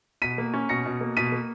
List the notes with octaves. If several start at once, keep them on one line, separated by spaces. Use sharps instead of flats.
B2 B6 D#7
A#3
C#4
B2 A#6 C#7
B2
A#3
B2 B6 D#7
A#3